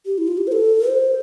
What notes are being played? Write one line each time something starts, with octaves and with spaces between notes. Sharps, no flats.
G4
E4
F4
G4
C5
A4
C5